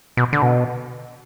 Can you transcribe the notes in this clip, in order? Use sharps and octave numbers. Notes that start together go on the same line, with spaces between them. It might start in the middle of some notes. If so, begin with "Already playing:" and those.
B2
D3
B2